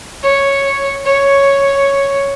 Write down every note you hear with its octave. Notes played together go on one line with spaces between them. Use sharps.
C#5
C#5